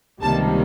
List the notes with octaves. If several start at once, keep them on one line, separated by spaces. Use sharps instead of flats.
C#2 C3 D#3 G3 A#3 A5